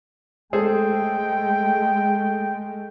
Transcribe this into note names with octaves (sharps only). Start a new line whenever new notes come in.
G#3 A3 G#4 A4 C5 G5